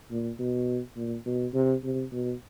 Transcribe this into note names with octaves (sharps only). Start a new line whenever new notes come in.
A#2
B2
A#2
B2
C3
C3
B2